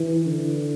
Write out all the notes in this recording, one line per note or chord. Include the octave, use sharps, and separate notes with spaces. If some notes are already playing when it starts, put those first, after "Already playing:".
Already playing: E3
D3